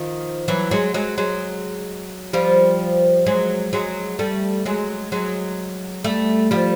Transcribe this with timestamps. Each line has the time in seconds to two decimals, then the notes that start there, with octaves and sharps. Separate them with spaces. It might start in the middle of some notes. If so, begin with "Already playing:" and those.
Already playing: D#3 F3
0.48 E3 F#3
0.71 F#3 G#3
0.94 F#3 G#3
1.18 F#3 G#3
2.33 F3 G3
3.26 F#3 G#3
3.73 F#3 G#3
4.19 G3 A3
4.66 F#3 G#3
5.12 F#3 G#3
6.04 G3 A3
6.51 F3 G3